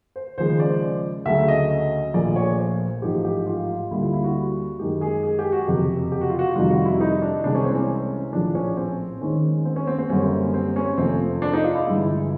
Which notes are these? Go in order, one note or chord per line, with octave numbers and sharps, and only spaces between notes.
C5
D#2 C#3 F3 G#3 C5
D5
D2 C#3 F#3 A3 E5
D#5
A#1 A#2 F3 A3 D5
C#5
C5
A1 G#2 F3 A3 G4
G4
F4
D2 D3 G3 A#3 E4
F4
E4
F#4
F#2 D#3 G#3 G4
G#4
G#4
G4
F#4
F#1 F2 C3 G4
G4
F#4
F4
F#4
F2 C3 D#3 G3 F4
F#4
E4
D#4
D4
C2 C3 E3 G#3 D4
C#4
C4
C#4
A#1 A2 F3 D4
C#4
C4
D#2 D#3 G#3 C#4
C4
C#4
C4
C4
F#2 D3 G3 A#3 C#4
C4
C#4
F2 C3 F3 A3 C4
D4
D#4
F4
E4
G1 G2 E3 G#3